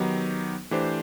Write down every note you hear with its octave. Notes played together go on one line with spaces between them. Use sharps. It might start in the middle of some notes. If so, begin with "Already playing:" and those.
Already playing: D#3 F#3 B3 D#4 G4
E3 A3 D4 G4 C5